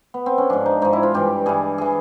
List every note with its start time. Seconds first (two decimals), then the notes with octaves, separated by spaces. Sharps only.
0.14 B3
0.26 C4
0.38 C#4
0.50 G#2 F3 D4
0.66 D#4
0.82 G#2 F3 D#4
0.93 E4
1.03 F4
1.14 G2 E3 G4
1.46 G2 E3 G#4
1.78 E3 G#4